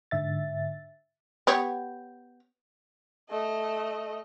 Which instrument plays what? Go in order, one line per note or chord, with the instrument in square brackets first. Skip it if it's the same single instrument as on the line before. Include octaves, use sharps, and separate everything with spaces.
[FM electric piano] G#2 D3 E5 A6
[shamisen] B3 G4 C#5
[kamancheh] A3 D#5